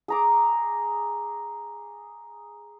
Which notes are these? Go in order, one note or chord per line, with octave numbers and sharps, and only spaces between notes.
G#4 A#5 D6